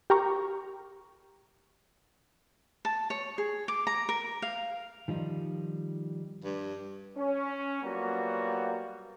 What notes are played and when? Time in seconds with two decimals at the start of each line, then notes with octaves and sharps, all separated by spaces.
0.10 G4 A#4 A#5 C#6
2.85 A5
3.10 C#5
3.38 G#4
3.68 D6
3.87 A#5
4.09 A#4
4.42 F5
5.08 D#3 F3 G3 D#4
6.44 G2
7.17 C#4
7.82 F#3 G3 A#3 B3 F4 F#4